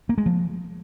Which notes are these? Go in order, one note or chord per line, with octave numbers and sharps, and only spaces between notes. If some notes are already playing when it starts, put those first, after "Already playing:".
A#3
G#3
F3